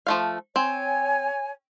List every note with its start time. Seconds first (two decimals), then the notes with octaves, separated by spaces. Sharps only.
0.07 F3 A3 F5
0.56 C4 C#5 G#5